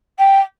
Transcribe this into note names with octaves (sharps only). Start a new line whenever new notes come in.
G5